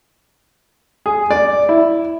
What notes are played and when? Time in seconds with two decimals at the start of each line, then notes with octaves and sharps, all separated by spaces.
1.06 G#4
1.31 D5
1.69 E4